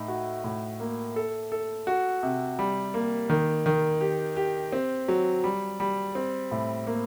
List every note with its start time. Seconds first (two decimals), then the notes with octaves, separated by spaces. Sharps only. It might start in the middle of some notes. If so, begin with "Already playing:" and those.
Already playing: A2 D#4
0.08 F#4
0.44 A2
0.80 A#3
1.16 A4
1.52 A4
1.87 F#4
2.23 C3
2.59 G3
2.94 A#3
3.29 D#3
3.66 D#3
4.01 G4
4.37 G4
4.73 C4
5.08 F#3
5.44 G3
5.80 G3
6.15 C4
6.51 A2
6.87 A#3